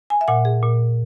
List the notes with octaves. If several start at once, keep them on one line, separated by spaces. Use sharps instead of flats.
G#5
E5
A#2 F#5
G#4
A#2